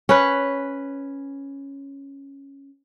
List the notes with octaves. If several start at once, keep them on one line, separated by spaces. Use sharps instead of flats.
C#4 B4